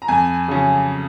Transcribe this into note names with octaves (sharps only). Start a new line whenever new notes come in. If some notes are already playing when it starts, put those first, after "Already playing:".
A#5
F2 G#5
C#3 F#3 C#4